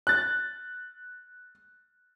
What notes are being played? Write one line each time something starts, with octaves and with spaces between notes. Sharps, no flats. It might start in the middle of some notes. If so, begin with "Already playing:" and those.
F#6 A6